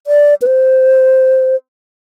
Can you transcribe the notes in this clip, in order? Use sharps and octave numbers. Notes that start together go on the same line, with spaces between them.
D5
B4
C5